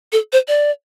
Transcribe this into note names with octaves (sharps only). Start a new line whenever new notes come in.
A4
C5
D5